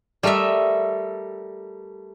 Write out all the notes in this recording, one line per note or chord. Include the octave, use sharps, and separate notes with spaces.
G3 A3 A#4 D#5 E5